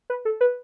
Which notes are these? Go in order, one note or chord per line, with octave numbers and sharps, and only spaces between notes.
B4
A4
B4